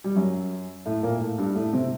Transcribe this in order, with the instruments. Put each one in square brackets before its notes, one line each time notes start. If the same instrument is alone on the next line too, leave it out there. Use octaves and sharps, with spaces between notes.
[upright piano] G3
F#2 F#3
A2 A3
A#2 A#3
A2 A3
G2 G3
A2 A3
C3 C4